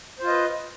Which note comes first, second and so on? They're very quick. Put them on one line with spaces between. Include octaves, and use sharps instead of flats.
C5 F4 D#5 B4